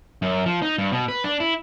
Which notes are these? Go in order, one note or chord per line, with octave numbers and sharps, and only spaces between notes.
F#2
F3
D#4
G2
B2
B4
D4
E4